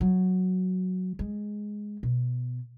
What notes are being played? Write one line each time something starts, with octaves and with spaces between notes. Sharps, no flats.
F#3
G#3
B2